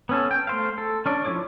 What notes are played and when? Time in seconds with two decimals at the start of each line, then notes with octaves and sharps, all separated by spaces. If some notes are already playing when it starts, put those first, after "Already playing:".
0.09 B3 C#4 A4
0.31 G5
0.47 A3 C5 F5
0.78 A4
1.06 C#4 D4 D5
1.25 F3 C4 E4 C#5 D6